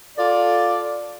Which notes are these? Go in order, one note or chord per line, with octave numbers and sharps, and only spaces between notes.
F4 A4 D5